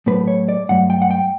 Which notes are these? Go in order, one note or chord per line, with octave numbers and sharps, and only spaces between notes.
A2 F#3 A3 B4
C#5
D5
G2 F#3 A3 F#5
G5
F#5
G5